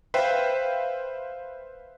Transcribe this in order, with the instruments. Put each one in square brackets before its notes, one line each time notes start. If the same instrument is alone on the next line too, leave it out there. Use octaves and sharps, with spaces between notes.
[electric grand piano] B4 C5 E5 F5 G5